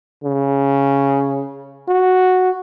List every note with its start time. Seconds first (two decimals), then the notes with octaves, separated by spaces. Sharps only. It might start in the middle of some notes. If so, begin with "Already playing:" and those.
0.24 C#3
1.89 F#4